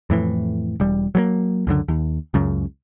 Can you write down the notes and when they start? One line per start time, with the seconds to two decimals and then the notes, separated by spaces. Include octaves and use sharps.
0.10 F2 A2 E3
0.80 E1 G3
1.15 F#3 G3 A#3
1.67 C#2 F#2 D3
1.88 D#2
2.34 C#2 F#2 C#3